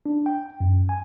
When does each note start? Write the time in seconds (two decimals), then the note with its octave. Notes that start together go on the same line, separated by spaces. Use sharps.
0.06 D4
0.26 G5
0.60 F#2
0.89 G#5